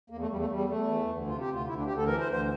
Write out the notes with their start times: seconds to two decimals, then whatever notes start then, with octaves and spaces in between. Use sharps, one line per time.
0.10 E2 A#3
0.20 A3
0.29 E2 G3
0.39 A3
0.49 E2 G3
0.69 E2 A3
0.88 E3
1.08 D2
1.28 C3 F4
1.40 G4
1.48 D2
1.53 F4
1.67 D2 E4
1.77 D4
1.86 D2 G4
1.97 A4
2.06 E3 A#4
2.20 C5
2.26 D2
2.32 C5